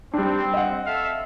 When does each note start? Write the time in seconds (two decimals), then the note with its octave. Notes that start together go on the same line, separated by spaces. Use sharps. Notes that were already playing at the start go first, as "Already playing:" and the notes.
0.13 G3 C4 D4
0.54 D#5 F#5
0.86 A4 E5 F5